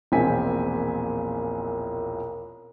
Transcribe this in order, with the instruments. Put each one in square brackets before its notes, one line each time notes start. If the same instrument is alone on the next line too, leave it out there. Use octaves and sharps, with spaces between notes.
[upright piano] E1 A#1 A#2 C4 G#5 B6